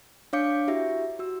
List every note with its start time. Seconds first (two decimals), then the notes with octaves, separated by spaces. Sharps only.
0.33 D4 C#5 F5 D6 G6 C#7
0.68 E4 F#4 G4 E5
1.19 F#4 E6